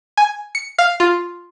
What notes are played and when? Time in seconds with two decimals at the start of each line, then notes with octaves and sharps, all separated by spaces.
0.17 G#5
0.55 C#7
0.78 F5
1.00 F4